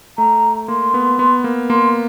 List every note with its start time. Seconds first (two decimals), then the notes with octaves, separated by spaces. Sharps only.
0.18 A3 A#5
0.68 A#3 C6
0.94 B3
1.19 B3
1.44 A#3
1.70 A#3 C6